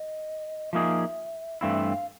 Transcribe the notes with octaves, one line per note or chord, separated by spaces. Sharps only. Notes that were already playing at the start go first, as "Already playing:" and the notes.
Already playing: D#5
F3 A#3 D#4 G#4 E5
G2 E3 A3 C4 E4 F5
E5
F5